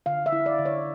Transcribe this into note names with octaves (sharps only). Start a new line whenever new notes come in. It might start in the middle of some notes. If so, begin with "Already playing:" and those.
D3 F5
E5
E4
D5
D3
C#5